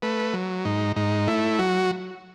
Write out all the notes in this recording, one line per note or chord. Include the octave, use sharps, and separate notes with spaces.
A3 B4
F#3
G#2 D#4
G#2 D#4
A3 E4
F#3 F#4